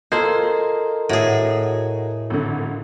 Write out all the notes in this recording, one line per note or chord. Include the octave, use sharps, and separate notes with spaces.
F4 A4 A#4 C5 D#5 G#6 C7
A2 F#4 G#4
G#1 D3